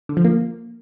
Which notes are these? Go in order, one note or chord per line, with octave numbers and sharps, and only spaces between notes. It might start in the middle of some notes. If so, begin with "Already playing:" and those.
D3
F3
A#3